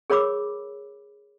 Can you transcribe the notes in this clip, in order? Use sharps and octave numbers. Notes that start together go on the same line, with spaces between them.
G#4 A#4 C#5 B5 D6 E6